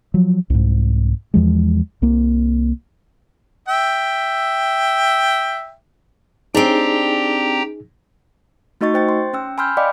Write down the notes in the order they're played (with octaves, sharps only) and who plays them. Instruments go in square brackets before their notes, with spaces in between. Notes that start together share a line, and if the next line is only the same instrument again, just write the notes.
[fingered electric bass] F3 F#3
C2 G#2
E2 F3 G#3
C2 A#3
[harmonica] E5 G5
[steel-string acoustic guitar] C4 D4 [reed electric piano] D#4 G#4 [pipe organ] G4 G5 A#5
[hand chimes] A3 D#4 F#4 D#5 C#6 A6
C5 G5 A6
C6
C#4 G5 E6
G#5 B5 C6 E6 F6 G6
D5 D#5 F5 G5 B5 D6